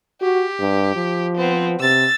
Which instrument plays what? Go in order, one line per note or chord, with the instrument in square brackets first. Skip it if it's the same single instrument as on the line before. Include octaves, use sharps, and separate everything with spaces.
[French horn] F#4 [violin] G4
[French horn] G2
F3
[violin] B3 C4
[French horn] C3 [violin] E6 A6